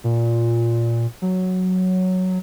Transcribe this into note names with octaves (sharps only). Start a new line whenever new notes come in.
A#2
F#3